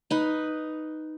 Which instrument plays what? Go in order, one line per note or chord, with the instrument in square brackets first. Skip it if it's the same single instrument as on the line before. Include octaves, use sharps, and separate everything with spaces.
[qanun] D#4 B4